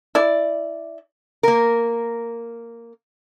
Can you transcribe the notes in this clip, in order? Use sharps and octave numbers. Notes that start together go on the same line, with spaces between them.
E4 D5
A#3 A#4